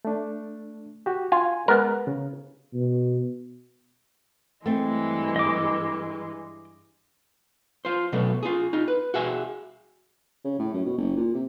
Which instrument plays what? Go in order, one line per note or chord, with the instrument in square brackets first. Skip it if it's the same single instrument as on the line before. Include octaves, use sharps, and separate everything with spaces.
[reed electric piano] A3 D4
F#4 G4
[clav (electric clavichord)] F4 [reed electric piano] G#5
[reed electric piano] G#3 [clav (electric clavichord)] B3 A#4
[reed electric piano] C#3
[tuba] B2
[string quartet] G2 E3 G#3 [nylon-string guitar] A3 C4
[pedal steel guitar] D#5 D6
[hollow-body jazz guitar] F4 C5
B2 F#3 A3 B3
F4 G#4
D#4 F4
B4
F#4 G#4 E5 G#5
[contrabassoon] C#3
A2
F#2
B2
F#1
A#2
C3